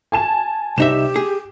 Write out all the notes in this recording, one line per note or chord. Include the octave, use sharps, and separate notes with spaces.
G#5 A5 E7
C2 D#4 G4 E5 E7
G#4